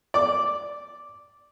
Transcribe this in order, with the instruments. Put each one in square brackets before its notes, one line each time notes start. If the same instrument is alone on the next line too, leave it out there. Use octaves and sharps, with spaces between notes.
[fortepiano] D5 D6